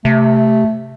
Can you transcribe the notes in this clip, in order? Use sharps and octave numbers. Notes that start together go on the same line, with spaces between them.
C3 A3